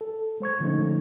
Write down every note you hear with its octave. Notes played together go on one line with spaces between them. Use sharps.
A4
G#3 C5 C#6 G#6
D3 F3 G#3 A3 C#4 D#4